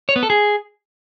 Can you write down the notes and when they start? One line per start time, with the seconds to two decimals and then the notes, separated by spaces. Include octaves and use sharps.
0.09 C#5
0.16 B3
0.23 A4
0.30 G#4